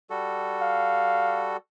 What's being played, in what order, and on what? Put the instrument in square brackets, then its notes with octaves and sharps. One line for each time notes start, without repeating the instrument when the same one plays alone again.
[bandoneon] G3 F#4 A4
[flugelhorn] F5